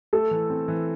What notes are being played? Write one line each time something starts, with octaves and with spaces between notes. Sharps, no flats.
A3 A4
E3
C4
E3